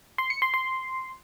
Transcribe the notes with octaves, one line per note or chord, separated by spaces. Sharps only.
C6
C#7
C6
C6